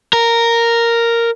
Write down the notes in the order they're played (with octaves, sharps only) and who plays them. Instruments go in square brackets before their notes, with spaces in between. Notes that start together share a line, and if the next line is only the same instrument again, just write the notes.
[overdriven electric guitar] A#4